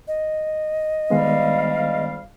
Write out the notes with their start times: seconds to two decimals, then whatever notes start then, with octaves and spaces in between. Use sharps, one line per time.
0.08 D#5
1.10 D2 D#3 G3 G#3 B3 F5